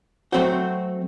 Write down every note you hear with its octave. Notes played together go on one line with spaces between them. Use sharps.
F#3 A3 C4 F#4 C5